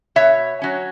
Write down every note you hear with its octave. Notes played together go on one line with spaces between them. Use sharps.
B2 C#5 E5
F#3 C#4